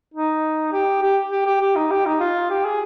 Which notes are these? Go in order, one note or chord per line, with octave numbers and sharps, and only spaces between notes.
D#4
G4
G4
G4
G4
G4
D#4
G4
D#4
F4
G4
G#4